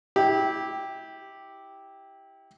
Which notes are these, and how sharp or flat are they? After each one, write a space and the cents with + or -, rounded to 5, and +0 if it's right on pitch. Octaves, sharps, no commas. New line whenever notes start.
E4 -25 G4 +0